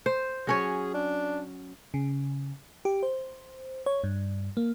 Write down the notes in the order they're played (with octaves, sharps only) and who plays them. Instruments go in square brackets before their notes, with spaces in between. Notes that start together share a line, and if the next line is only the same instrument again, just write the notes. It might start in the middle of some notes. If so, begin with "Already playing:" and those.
[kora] C5
[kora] F#3 C#4 C#5 [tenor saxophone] G#4
[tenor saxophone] D4
[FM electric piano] C#3
G4
C5
C#5
G2
A#3